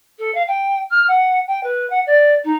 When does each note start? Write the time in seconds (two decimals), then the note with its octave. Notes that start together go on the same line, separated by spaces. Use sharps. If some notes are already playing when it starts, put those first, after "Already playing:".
0.19 A4
0.34 F5
0.48 G5
0.91 F6
1.08 F#5
1.47 G5
1.63 B4
1.90 F#5
2.06 D5
2.44 D#4